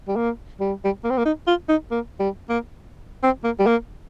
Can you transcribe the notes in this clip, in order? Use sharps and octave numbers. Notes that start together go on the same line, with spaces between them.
G3
A#3
G3
G3
A#3
C4
A#3
D#4
F4
D#4
A#3
G3
A#3
C4
A#3
G3
A#3